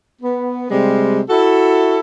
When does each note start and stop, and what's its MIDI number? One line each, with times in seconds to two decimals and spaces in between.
0.22 0.68 59
0.71 1.20 48
0.71 1.20 55
0.71 1.20 56
1.30 2.00 64
1.30 2.00 66
1.30 2.00 69